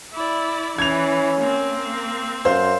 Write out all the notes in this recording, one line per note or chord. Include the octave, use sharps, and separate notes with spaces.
E4 D5
E3 C#4 G#6 F7
A#3 C4
F#2 C5 F5 C6